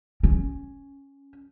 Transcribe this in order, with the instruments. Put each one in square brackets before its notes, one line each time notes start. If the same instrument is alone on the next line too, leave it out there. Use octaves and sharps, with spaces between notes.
[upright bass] C#4